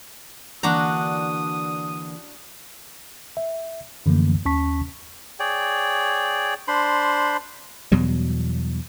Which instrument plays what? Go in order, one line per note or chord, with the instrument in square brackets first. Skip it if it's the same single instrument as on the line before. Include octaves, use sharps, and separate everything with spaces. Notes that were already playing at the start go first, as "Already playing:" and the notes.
[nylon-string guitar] D3 E3 A#3 [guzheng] D4 F#4 A#5 [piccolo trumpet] D#6
[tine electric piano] E5
F#2 D3 E3 F3 A3 A#3
D#2 C#4 A5 C#6 B6
[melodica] G#4 C#5 D5 G5
D4 C5 B5 C6
[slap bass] E2 B2 F#3 G3